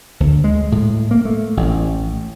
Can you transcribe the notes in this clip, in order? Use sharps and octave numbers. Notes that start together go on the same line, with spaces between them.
D2
G#3
A2
A#3
A3
A1